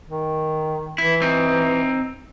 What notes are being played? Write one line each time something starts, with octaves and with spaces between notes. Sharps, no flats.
D#3
E3 E4
C4 D#4